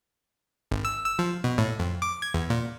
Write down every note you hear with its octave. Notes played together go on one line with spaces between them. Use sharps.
G#1
E6
E6
F3
B2
A2
F2
D6
G#6
E2
A#2